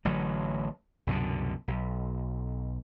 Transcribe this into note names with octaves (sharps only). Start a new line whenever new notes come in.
A1 D3 F#3
C2 F#2 B2 D3
B1